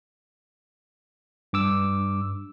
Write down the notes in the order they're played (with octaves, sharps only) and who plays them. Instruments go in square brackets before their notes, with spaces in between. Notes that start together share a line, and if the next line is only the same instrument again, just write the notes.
[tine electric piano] G2 D6 E6